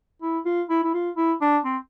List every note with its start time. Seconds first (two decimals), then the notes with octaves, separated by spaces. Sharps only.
0.22 E4
0.46 F4
0.69 E4
0.84 E4
0.94 F4
1.17 E4
1.41 D4
1.65 C4